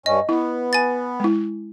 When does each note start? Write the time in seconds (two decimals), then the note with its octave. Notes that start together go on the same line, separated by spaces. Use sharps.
0.06 G2 C#4 D#5
0.29 B3 E4
0.73 G#5 A6
1.20 G#3 E4